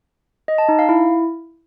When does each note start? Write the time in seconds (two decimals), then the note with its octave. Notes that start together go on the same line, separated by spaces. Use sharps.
0.48 D#5
0.58 A5
0.69 D#4
0.79 F5
0.89 E4